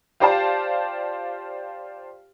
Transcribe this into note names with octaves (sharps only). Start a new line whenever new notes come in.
F4 G4 C5 D5 F5 A5